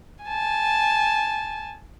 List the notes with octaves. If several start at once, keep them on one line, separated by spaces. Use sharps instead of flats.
G#5 A5